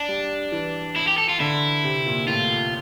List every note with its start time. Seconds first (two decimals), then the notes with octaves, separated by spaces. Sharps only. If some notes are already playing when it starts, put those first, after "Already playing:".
Already playing: D4
0.09 G3
0.52 E3
0.96 E4
1.08 G4
1.18 A4
1.29 F4
1.40 D3 E4
1.84 C3
2.06 A#2
2.28 A2 F4